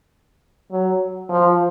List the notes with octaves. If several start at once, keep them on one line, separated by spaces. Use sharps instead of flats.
F#3
F3